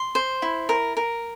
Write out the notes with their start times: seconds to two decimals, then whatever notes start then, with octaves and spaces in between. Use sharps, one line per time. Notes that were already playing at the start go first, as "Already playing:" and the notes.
Already playing: C6
0.15 C5
0.42 E4
0.69 A#4
0.97 A#4